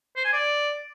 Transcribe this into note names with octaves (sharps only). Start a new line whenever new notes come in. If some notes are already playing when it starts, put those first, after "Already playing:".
C5
G#5
D5